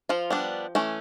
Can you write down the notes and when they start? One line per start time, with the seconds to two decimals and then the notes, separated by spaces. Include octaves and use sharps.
0.09 F3 F4
0.30 G3 B3 D4
0.75 E3 A3 C#4